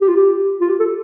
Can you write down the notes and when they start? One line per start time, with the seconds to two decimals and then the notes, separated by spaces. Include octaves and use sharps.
0.01 G4
0.08 F4
0.16 G4
0.61 F4
0.69 G4
0.79 A4